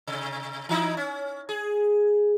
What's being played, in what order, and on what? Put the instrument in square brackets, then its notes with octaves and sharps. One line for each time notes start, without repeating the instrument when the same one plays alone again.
[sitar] C3
E3 D#4 E4
C#4
G#4